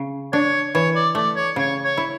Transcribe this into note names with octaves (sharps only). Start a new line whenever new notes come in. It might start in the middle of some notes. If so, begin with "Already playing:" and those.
Already playing: C#3
D4 C#5
E3 C#5
D5
A3 D5
C#5
C#3 C#5
C#5
E4